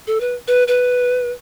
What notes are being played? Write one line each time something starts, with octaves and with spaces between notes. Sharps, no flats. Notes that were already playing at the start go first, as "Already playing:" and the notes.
A4
B4
B4
B4